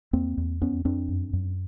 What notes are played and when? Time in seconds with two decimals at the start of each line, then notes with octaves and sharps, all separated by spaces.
0.13 E2 A#3 C4
0.37 E2
0.62 F2 B3 C#4
0.85 F2 C4 D4
1.09 F#2
1.33 F#2